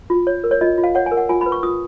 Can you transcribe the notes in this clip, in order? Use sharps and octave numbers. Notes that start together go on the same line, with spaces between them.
F4
C#5
A#4
C#5
F4 D#5
F4
F5
C#5 F#5
G#5
A#4
F#5
F4 G#5
B5
B4
C#6
F4 D#6